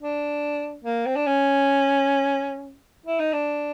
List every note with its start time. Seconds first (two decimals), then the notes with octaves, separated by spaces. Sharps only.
0.02 D4
0.85 A#3
1.06 C4
1.16 D4
1.27 C#4
3.06 E4
3.20 D#4
3.33 D4